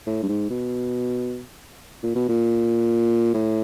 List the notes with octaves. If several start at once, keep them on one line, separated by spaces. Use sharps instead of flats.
A2
G2
G#2
B2
A#2
B2
A#2
A2